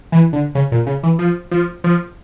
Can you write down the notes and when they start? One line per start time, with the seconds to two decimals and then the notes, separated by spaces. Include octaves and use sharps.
0.12 E3
0.33 D3
0.55 C#3
0.72 A#2
0.87 C#3
1.03 E3
1.19 F3
1.51 F3
1.84 F3